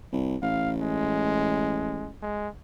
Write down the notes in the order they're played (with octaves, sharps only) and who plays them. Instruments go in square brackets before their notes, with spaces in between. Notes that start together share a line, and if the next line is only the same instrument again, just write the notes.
[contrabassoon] C2
[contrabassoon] A1 [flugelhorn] F5
[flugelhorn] G#3
G#3